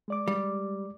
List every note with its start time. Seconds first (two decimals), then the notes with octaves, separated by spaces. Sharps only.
0.08 G#3 D5 D6
0.28 G3